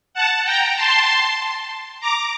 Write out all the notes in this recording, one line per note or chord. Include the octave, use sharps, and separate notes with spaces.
F#5 A5
G5 A#5
A5 C6
A#5 D6